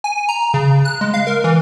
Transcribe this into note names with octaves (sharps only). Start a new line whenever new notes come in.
G#5
A#5
C#3
F#6
G#3
F5
A#4
E3